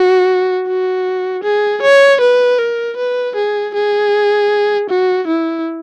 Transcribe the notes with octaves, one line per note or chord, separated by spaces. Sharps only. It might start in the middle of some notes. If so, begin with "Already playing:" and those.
Already playing: F#4
F#4
G#4
C#5
B4
A#4
B4
G#4
G#4
F#4
E4